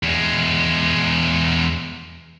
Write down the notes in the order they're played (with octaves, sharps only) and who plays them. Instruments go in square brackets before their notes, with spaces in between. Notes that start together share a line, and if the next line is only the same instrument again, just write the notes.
[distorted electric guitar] E2 G#3